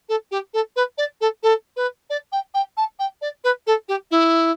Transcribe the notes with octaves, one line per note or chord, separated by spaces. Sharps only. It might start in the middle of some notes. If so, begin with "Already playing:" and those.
A4
G4
A4
B4
D5
A4
A4
B4
D5
G5
G5
A5
G5
D5
B4
A4
G4
E4